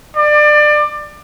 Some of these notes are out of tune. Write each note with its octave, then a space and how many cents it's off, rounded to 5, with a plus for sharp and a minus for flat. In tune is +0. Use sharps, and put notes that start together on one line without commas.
D5 +25